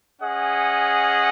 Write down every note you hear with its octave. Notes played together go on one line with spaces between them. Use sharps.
C#4 G#4 D#5 F#5